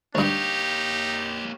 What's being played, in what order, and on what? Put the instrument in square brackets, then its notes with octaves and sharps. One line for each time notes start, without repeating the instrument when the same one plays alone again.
[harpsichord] D2 G2 [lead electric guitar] A#3 C#5 [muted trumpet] D#4 [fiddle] G4 F5